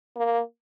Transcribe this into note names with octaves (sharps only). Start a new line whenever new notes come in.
A#3